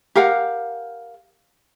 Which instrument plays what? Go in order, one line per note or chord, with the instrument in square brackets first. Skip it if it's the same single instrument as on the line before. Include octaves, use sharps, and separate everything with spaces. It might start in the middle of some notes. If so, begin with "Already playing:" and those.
[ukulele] G4 A#4 F5 F#5